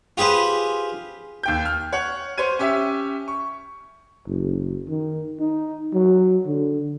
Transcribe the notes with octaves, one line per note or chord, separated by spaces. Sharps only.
F4 G4 G#4 B4 C5
D#2 G5 G6
F6
C#5 F#5
C5 C#5 G#6 D#7
C#4 G4 E5
C#6
F#1
D#3
D#4
F#3
D3